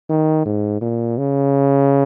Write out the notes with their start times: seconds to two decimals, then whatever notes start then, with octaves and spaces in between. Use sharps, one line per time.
0.10 D#3
0.45 G#2
0.81 A#2
1.18 C#3